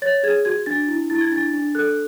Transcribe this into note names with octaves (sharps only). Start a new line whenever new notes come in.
C#5 A6
G#4 G#6
F#4 G#6
D4 A6
E4
E4 A6
G#6
D4 A6
D4
A4 F#6